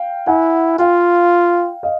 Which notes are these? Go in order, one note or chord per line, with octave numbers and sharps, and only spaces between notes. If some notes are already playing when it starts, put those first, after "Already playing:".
Already playing: F5 G5
E4 F#5 G#5
F4 F5 G5
D#5 F5